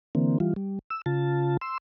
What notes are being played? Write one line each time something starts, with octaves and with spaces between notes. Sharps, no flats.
D3 E3 A#3 C4
E3 G3 F4
G3
E6
C#3 F4 A5
C6 E6